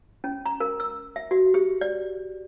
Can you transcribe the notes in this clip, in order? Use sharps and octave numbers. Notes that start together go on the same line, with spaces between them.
C#4
A#5
A#4
E6
E5
F#4
G4
D5